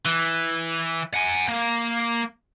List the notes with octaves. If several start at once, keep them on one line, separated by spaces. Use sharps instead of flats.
E3
F#5 G#5
A#3